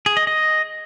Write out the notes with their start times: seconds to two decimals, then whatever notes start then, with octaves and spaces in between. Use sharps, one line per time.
0.06 G#4
0.17 D#5
0.27 D#5